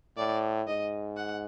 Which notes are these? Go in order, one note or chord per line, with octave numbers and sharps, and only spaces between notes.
A2 D5
G#2 D#5
F#5